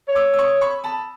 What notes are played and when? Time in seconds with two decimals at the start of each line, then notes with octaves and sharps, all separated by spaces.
0.08 C#5
0.15 D6 E6
0.34 E6
0.39 C#6 D#6
0.61 B5 C#6
0.84 A5 B5